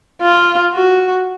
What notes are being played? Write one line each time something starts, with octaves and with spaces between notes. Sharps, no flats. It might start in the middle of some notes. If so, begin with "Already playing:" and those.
F4
F#4